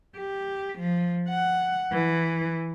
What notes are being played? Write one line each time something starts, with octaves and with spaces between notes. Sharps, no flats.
G4
F3
F#5
E3